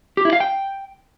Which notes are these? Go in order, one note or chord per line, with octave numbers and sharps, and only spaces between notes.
G4
E4
F5
G5